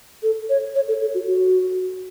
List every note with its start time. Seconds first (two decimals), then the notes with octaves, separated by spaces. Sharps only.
0.23 A4
0.49 C#5
0.75 C#5
0.88 A4
1.01 A4
1.14 F#4
1.27 F#4